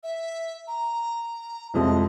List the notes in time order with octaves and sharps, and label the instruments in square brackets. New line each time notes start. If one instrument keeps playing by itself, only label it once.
[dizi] E5
A#5
[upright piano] C2 F2 G#3 [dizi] D#5